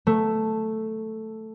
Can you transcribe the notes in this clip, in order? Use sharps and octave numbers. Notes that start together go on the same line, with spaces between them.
A3